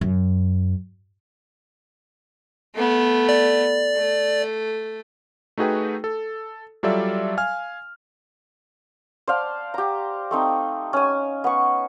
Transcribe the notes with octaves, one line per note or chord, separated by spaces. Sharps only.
F#2
A3 B3
D5
A3
A3 D#4 F#4 G#4 B4 G5
A4
F#3 G3 F4 A4 D5 E5
F5 G#5 F6
C5 D5 F5 A5
G4 A#5
A3 C4 D#4
C#4 G#5
B3 C#6